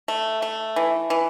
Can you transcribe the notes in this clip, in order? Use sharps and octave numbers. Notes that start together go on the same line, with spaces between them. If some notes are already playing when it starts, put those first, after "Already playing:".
A3
A3
E3
E3